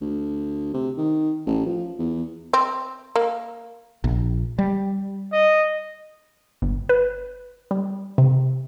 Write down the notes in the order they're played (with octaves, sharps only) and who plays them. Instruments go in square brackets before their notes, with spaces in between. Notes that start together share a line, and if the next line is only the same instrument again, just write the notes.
[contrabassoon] D2
C3
D#3
A1
F3
E2
[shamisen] C4
A#3
[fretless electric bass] A#1
G3
[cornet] D#5
[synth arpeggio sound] G1
B4
G3
C3